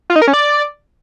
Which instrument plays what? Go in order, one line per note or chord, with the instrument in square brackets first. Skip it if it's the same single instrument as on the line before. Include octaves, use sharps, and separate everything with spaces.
[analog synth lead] F4
D#4
A#4
C#4
D5